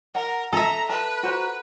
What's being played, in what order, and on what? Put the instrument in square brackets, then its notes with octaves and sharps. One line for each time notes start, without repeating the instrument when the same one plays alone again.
[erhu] A#4 [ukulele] F#5
[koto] A4 E5 [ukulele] G#5 [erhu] A#5
[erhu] B4 [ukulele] A5
[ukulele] F#4 C5 A#5